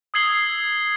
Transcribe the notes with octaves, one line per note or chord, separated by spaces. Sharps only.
D#6 E6 G#6 C7 F#7 G7